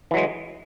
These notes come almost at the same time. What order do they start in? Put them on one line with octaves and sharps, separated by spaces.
E3 F#3 G#3